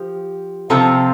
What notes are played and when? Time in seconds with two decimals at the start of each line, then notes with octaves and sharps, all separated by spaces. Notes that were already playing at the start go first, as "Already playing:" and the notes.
Already playing: F3 G4
0.70 C3 F3 C4 F4 A4